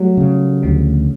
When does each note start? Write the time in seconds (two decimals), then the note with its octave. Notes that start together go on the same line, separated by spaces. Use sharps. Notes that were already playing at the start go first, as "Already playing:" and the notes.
Already playing: F#3 G3 A3
0.17 C#3
0.63 D2 F3 G3